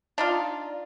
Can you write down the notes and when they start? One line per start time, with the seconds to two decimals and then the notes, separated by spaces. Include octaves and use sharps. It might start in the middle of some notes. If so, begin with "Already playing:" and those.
0.18 D4 D#4 F4